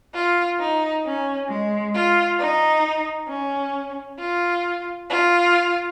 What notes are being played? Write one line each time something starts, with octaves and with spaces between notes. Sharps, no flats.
F4
D#4
C#4
G#3
F4
D#4
C#4
F4
F4